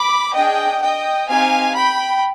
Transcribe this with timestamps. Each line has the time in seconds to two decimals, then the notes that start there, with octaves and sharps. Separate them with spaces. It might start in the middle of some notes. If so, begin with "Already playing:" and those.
Already playing: B5 D6
0.34 D4 G#4 D#5 G5
0.81 D#5 G5
1.28 C4 D#4 G4 F5 G#5
1.76 G5 B5